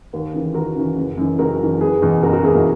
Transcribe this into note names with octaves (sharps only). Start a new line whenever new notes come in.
D#2
C#3 E3
D#2 F#4 A#4
C#3 E3
F#1
F#2 E3
F#1 F#4 A#4
F#2 E3
F#1 G#4 B4
E2 B2
F#1 F#4 A#4
F#4 A#4
E2 B2 E4 G#4
A#3